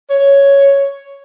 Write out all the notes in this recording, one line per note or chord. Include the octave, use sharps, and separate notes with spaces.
C#5